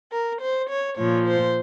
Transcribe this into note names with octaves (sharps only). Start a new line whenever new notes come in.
A#4
C5
C#5
A#2 F3 C#5
C5